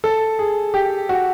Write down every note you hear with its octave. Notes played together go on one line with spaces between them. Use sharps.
A4
G#4
G4
F#4